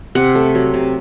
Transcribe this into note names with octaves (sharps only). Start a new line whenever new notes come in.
C3 F#5
A3
F#3
C3